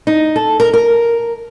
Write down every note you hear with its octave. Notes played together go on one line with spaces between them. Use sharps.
D#4
A4
A#4
A#4